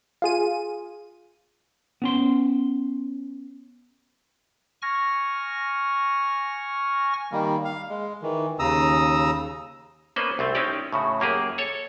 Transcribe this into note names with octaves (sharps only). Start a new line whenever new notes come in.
F4 G#4 D#7
B3 C#4 C6
G#5 C#6 F6 A#6
D#3 G3 A#3
F5
G#3
D#3 E3
D#2 C#3 A#5 D#6 E6
A#3 B3 C#4 B4 C5 D#5
C2 A3 C4
C4 C#4 D#4 E4 G4 D5
A2 C#3 F#4
F#2 A#3 G4 G#4
A4 C#5